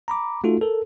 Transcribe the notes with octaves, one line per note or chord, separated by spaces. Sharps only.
A#5 B5 D6
A3 D#4 F4 F#4 A4
A4 A#4